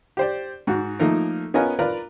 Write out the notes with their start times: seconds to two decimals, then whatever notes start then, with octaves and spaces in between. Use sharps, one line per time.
0.17 G4 C5 D5
0.67 G#2 F#4
1.00 F3 A3 A#3 D#4 A#4
1.54 B3 C#4 F4 A#4 D#5 G#5
1.79 F4 A#4 B4 D5 A#5